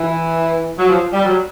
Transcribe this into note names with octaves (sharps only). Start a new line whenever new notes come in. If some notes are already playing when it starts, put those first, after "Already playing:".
Already playing: E3
F#3
F3
G3
F#3